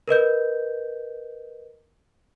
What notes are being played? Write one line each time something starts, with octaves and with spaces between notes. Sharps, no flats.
A#4 B4 D#5 G6